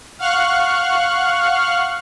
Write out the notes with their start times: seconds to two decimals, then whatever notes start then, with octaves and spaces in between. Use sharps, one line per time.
0.19 F5 F#5 C#6 F6 F#6